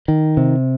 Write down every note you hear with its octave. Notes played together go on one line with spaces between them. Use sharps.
D#3
C3